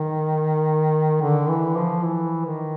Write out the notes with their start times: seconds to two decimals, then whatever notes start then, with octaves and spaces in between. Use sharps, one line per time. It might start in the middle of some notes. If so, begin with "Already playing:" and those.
Already playing: D#3
1.21 D3
1.49 E3
1.76 F3
2.04 E3
2.46 D#3